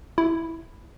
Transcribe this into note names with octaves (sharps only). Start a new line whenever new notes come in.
E4